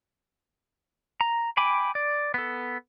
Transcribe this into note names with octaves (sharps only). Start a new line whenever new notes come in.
A#5
G5 G#5 B5 D6
D5
B3 A4